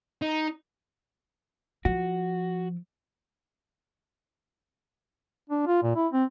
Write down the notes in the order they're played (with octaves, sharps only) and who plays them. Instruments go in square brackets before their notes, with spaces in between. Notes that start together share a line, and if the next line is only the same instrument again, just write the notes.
[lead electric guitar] D#4
[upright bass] F3 [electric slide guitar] F#4
[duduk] D4
F4
A#2
E4
C4